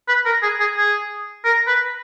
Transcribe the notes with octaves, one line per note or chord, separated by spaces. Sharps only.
B4
A#4
G#4
G#4
G#4
A#4
B4